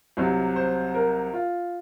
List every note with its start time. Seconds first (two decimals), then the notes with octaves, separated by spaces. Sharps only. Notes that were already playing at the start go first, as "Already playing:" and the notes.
0.17 C2 C3 F#3
0.56 C5
0.94 A#4
1.33 F4